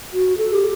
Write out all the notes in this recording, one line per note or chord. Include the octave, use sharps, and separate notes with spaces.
F#4
A4
G4